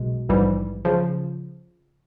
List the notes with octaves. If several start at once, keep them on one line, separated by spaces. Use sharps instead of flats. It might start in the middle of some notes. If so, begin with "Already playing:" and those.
Already playing: B1 B2 G#3
A#1 G#2 E3 G3
C#3 F3